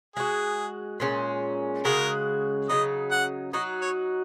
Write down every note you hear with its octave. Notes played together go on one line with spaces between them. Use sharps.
G#3 F#4 G#4
A#2 G#3 C#4
C#3 G#3 F#4 A#4
C#3 F#3 D#4 D#5
F#5
F#3 D#4 F#4 D#5
C#5